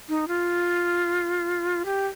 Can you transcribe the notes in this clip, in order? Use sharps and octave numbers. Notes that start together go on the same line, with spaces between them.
D#4
F4
G4